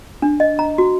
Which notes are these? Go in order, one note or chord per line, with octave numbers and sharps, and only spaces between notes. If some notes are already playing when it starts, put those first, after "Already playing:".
D4
D#5
A#5
F#4